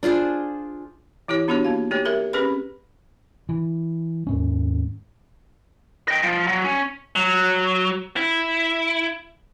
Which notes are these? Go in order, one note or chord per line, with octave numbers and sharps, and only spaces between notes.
D4 F4 G#4 C5
E3 E4 G4 C#5
B3 D4 D#4 F#4 G4 C#5
A#3 F5
A3 D#4 G4 C#5
G4 A4 A#4 E5
C4 C#4 G4 G#4 B4 B5
E3
D#2 G#2 C#4
D#5 G5
F3
F#3
C#4
F#3
E4